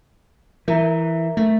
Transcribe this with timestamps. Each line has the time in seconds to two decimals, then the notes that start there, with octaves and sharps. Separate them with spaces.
0.68 E3 A#4 E5 A#5
1.37 A3